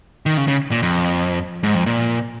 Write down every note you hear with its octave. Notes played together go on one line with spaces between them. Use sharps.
D#3
C#3
C#3
A#2
F2
G#2
F2
A#2